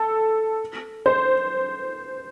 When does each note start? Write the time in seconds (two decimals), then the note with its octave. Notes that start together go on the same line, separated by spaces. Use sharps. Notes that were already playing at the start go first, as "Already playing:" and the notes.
Already playing: A4
1.06 C5